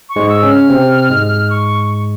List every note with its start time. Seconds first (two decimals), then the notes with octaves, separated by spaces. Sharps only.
0.09 C#6
0.16 G#2 G#3
0.30 E6
0.43 C#3 C#4
0.49 F6
0.70 C3 C4
1.10 G#2 G#3
1.50 C#6